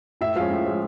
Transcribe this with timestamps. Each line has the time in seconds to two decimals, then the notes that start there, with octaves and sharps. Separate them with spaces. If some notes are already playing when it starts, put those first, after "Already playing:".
0.21 A2 E5
0.36 F3 G#3 C#4 F5
0.51 A2
0.66 F3 G#3 C#4